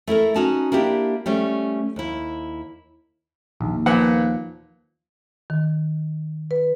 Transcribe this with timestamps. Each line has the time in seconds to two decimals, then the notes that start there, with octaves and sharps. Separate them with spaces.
0.07 A3 E4 A4 A#4
0.36 C#4 D#4 F#4 A5
0.72 A#3 D4 E4 G4
1.26 G3 A3 C#4
1.96 D#2 E4
3.61 A#1 D#2
3.86 A#2 F3 B3 F#5
5.50 D#3
6.51 B4